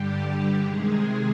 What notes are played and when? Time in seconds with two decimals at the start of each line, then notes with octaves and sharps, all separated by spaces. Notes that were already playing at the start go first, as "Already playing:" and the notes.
Already playing: G2 D3 G3 G4
0.65 C3 D#3 G#3 G#4